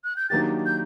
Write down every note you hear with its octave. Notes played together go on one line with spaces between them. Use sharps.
F#6
G6
D#3 F#3 A#3 D4 G4 A6
G6